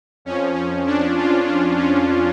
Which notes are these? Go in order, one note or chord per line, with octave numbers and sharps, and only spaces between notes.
F2 F3 C#4
C#4
D4
F4
D4
C#4